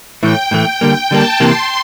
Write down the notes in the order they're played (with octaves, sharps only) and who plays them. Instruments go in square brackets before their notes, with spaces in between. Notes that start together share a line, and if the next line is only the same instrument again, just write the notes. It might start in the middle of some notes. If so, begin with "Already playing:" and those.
[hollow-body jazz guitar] A2 E3 A3 [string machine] G5
[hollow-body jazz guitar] A2 E3 A3
[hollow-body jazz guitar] D3 G3 A#3 [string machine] G5
[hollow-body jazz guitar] D3 G3 A#3 [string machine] A5
[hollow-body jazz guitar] C3 E3 A#3 [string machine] C6